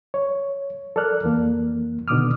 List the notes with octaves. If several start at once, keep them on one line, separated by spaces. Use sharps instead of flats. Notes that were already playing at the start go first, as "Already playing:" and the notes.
C#5
A4 A#4 D5 F6 F#6
F2 E3 A#3
B2 D3 D#3 D6 D#6 F6